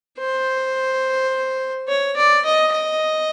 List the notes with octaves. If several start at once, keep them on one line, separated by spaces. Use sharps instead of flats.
C5
C#5
D5
D#5
D#5